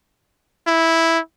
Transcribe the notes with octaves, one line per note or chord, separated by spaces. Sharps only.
E4